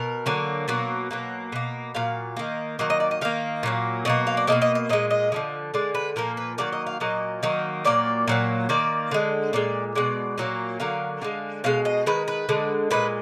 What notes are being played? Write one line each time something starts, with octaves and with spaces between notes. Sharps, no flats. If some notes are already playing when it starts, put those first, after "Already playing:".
Already playing: B2 A#4
D3 F#3 A#3
B2 F#3 A#3
B2 F#3 A#3
B2 A#3
A#2 F#3 F5
D#3 A#3
D#3 F#3 A#3 D#5
D#5
D5
D#5
D#3 A#3 F5
A#2 F#3 A#3
B2 F#3 A#3 D#5
F5
D5
B2 F#3 A#3 D#5
D#5
D#5
A#2 G#3 D#5
D#5
D3 F3 G#3
D3 G#3 D5
B4
A#2 F3 A#3 A#4
B4
D#3 F#3 A#3 D5
D#5
F5
A#2 F#3 A#3 D#5
D#3 F#3 A#3
A#2 F#3 A#3 D5
A#2 F#3 A#3
D#3 A#3 D5
D3 G#3
A#2 G#3 D5
B2 G#3 D5
A#2 F#3 A#3
D3 F#3 A#3 F5
D3 G#3 F5
B2 G#3 F5
D#5
D#3 G#3 B4
B4
D3 G#3
A#2 G#3 B4